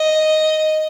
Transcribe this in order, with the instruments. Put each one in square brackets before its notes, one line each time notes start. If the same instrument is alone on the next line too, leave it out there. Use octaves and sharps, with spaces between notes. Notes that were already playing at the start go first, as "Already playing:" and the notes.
Already playing: [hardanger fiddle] D#5